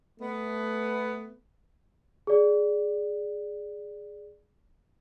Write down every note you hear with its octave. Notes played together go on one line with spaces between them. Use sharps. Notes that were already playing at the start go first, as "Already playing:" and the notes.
A3 B3
G#4 D5